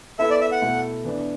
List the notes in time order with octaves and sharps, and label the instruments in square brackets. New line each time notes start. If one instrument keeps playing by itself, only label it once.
[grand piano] B3 E4 A4 [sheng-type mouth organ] E5
[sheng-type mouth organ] D5
E5
F#5
[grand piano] B2 A3 E4
E3 B3 D4